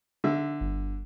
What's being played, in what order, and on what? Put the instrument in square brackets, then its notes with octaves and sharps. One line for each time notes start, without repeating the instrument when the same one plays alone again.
[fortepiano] D3 E5
[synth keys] G1